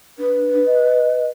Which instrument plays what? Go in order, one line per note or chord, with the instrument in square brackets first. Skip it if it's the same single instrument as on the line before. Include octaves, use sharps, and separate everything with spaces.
[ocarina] D4 [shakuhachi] B4
[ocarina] D#5